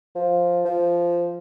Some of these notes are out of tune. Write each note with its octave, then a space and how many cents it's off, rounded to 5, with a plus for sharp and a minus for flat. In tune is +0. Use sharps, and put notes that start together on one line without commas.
F3 +5
F3 -10